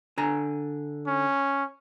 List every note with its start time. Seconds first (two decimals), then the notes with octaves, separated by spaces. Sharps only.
0.18 D3 G#5 A#5
1.07 C#4